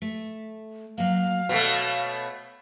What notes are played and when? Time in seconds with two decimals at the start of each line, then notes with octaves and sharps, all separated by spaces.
0.02 A3
0.98 F#3 A#3 F5
1.49 B2 A3 C#5